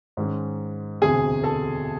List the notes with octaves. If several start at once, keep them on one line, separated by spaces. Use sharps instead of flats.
G#2 D#3 G#3 C#4
E1 D2 C3 G#4 G#5
A4 A5